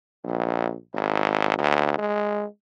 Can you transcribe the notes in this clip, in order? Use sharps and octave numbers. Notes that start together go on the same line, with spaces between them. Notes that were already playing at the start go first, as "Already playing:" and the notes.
A#1
G#1
D2
G#3